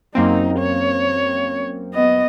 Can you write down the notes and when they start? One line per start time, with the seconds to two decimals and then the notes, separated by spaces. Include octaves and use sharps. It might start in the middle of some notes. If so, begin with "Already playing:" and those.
0.15 F#2 A#3 C4 D#4
0.59 C#5
1.94 B3 D#5